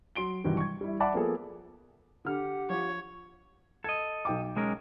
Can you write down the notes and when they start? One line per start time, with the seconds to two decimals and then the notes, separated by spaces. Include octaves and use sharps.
0.15 F#3 C6 D7 G7
0.44 G2 C3 D#3 E3 F#3
0.57 C#6 G#6
0.81 G3 E4
1.00 D5 E5 F#5 A5 B5 D6
1.14 F3 A#3 B3 G#4 A4
2.25 D3 G4 F#5 F6
2.70 F3 C#5
3.84 A4 D#5 G#6
4.25 B1 G5 D6
4.57 G#3 C#4 A#4